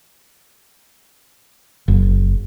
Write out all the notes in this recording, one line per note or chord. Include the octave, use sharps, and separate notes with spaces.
F#1